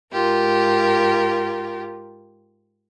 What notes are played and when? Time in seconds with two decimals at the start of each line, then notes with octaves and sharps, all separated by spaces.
0.12 G#2 F4 G4 A#4